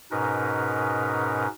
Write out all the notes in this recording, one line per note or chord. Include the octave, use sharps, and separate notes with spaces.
G#2 B2 C#4 D#4 A#4 B4